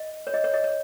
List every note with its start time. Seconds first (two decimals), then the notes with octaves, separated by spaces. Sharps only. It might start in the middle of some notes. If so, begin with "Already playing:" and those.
Already playing: D#5
0.27 C#5
0.34 D#5
0.44 C#5
0.54 D#5
0.64 C#5